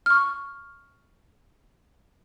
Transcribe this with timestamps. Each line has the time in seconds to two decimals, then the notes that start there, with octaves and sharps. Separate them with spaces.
0.06 C#6 F6